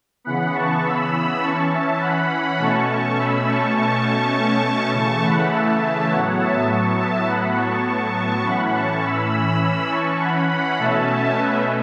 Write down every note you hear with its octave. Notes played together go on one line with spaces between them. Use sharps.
C#3 E3 B3 F#5 B5
A5 C#6
B5 E6
E3 C#4 A5 C#6
E5 A5
F#5 B5
B2 A3 C#4 A5 C#6
B5 E6
A5 C#6
B2 A3 C#4 A5 C#6
C#3 E3 A3 A5 C#6
F#5 B5
E5 A5
A2 F#3 B3 C#5 F#5
E5 A5
A5 C#6
E5 A5
A2 F#3 B3 F#5 B5
A5 C#6
A5 C#6
A2 E3 C#4 F#5 B5
A5 C#6
B5 E6
E3 C#4 B5 E6
A5 C#6
F#5 B5
F#5 B5
B2 A3 C#4 E5 A5
B4 E5